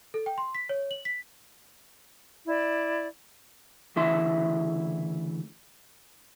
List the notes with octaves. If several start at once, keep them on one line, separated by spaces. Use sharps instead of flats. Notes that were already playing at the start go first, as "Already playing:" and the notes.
A4
G5
C6
B6
C#5
F#7
B6
E4 D5
D2 C#3 E3 E4 E5 C6